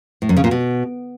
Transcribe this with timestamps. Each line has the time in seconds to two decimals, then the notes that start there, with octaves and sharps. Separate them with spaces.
0.22 A2
0.29 F#2
0.37 C#3
0.44 A#2
0.51 B2